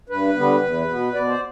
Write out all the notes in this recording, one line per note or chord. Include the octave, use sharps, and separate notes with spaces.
G2 B4
D3 G3 B3
E2
B2 B3
B2 D5
C5